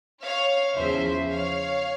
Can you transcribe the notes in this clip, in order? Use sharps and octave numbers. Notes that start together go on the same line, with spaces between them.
C#5 F5
E2 C#3 F3 C5 E5
C#5 F5